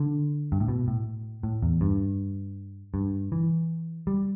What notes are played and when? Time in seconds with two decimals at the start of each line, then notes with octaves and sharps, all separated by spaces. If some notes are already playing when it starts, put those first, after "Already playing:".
Already playing: D3
0.52 G2
0.60 A2
0.68 B2
0.88 A2
1.43 A2
1.62 E2
1.81 G2
2.94 G2
3.32 E3
4.07 G3